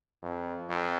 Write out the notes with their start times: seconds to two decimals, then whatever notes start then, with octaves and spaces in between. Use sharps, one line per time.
0.22 F2
0.69 F2